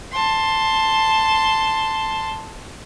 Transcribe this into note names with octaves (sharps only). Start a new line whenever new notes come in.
A5 C6